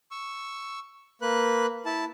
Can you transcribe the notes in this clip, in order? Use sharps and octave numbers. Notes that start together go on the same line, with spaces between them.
C#6 E6
A#3 B4 F#6
E4 A5